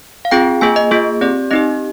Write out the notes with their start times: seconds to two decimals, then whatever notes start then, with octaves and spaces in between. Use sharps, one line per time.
0.25 F5
0.31 C4 F4 G#4 G5
0.61 A#3 F4 G#4 G#5
0.76 D#5
0.91 A#3 F4 G#4
1.21 C4 G4 D5
1.51 C4 D#4 G4 D#5